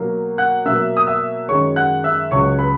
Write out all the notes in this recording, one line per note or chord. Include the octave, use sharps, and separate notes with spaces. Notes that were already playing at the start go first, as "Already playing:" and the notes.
Already playing: B2 F#3 A#3
F#5 F#6
B2 F#3 A#3 E5 E6
D#6
E5 E6
F#2 D#3 G#3 C#5 C#6
F#5 F#6
E5 E6
C#2 C#3 F#3 C#5 C#6
B4 B5